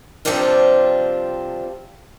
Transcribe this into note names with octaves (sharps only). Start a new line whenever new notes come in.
C3 F3 G3 C4 D4 F4